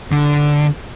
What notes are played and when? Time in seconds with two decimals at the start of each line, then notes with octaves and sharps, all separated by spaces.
0.12 D3